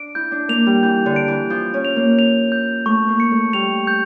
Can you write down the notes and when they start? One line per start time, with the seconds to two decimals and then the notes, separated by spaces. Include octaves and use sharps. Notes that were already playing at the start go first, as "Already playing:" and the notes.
Already playing: D4 D7
0.15 E4 G6
0.32 D4
0.49 A#3 F7
0.66 G3
0.83 E3 G6
1.06 D3
1.16 D7
1.28 E3
1.50 F3 G6
1.74 C#4
1.85 F7
1.96 A#3
2.19 F7
2.52 G6
2.86 A3 C#6
3.08 A#3
3.20 C#7
3.32 A3
3.53 G3 F7
3.87 G6